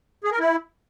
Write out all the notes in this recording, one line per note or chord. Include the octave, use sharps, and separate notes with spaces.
G#4
A#4
E4